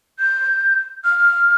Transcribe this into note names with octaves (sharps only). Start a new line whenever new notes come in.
G6
F6